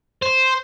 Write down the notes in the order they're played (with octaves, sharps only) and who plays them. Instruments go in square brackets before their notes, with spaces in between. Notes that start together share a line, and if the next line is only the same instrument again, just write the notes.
[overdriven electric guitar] C5